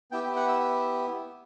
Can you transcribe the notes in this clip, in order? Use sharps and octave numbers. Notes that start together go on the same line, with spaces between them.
B3 E4 G4 G5
G5
F#5
E5